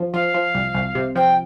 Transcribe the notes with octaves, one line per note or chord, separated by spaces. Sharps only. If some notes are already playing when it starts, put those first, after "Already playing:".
Already playing: F3
F3 F5
F3
C2
C2
C3
F3 G5